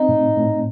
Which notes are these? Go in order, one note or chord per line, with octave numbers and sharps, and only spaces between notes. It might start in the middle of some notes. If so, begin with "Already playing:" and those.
Already playing: C4 D#4
A2
A2